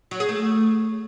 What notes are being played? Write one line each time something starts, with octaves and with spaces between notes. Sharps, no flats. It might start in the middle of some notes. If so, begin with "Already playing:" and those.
F#3
G#4
A3